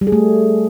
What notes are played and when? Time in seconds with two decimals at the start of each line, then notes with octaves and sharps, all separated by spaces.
0.01 G3
0.07 G#4
0.12 A3